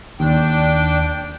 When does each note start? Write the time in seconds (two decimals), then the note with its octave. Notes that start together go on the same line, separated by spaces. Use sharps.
0.20 D#2 D4 G5